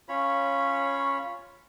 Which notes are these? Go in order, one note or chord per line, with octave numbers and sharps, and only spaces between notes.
C#4 F4 C#5 B5